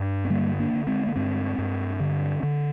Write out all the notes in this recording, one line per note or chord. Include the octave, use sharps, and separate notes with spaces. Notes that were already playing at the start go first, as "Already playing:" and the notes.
Already playing: G2
C4
D3 G3 A#3
A#3 D4
D3
G#3 C4
A#3
G2 G#3 C4
G2
D3
D3